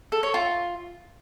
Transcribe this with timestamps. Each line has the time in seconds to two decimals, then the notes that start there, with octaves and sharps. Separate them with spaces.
0.12 A4
0.23 C#5
0.34 F4